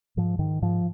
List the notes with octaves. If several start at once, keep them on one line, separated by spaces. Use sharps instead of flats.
G#2 F3
G#2 D#3
G#2 F3